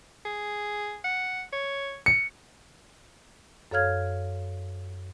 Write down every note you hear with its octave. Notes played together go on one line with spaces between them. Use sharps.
G#4
F#5
C#5
C#7
F#2 A4 C#5 F5 F6 G#6